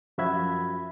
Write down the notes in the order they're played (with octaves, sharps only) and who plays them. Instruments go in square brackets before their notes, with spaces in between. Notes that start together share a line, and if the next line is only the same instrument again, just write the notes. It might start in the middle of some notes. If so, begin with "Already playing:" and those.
[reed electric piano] F#2 F3 F#4 E5 B5 G#6